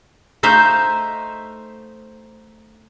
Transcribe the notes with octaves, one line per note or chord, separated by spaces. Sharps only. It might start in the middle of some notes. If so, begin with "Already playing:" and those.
A3 D#4 C5 E5 F5